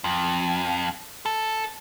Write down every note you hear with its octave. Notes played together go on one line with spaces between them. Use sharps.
F2
A4